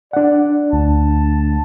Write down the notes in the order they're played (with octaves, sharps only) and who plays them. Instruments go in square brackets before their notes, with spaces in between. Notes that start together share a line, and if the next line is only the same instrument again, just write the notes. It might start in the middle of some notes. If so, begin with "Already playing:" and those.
[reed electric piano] D4 F#5 [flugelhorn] D5
[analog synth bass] D2 [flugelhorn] A5